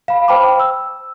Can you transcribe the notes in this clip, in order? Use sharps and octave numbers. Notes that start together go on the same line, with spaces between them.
F5 B5
C5 G5 A5 B5 D6
E6